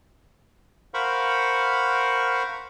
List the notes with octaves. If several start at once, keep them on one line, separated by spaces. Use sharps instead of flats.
A#4 C5 F5 F#5 B5 C#6